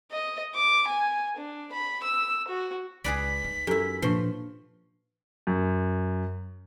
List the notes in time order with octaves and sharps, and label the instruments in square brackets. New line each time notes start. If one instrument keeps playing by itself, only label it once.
[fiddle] D#5
D6
G#5
D4
B5
E6
F#4
[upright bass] C#2 [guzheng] G#4 B4 D5 [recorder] B6
[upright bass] D#4
[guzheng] F#2 E4 [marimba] G4 A4
[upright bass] A#2 [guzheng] F3 C6 [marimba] D4 B4
[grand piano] F#2